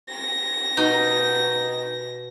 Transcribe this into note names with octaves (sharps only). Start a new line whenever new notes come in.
A#6
B2 D#4